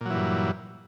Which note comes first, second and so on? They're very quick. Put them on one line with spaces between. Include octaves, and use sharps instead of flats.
A#2 F#3 E3 G2